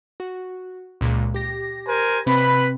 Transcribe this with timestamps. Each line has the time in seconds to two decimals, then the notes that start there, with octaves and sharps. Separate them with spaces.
0.20 F#4
1.01 C#2 A#2 G#3
1.34 G4 A#6
1.88 A#4 C5 G#5
2.26 C3 C4 B4 B5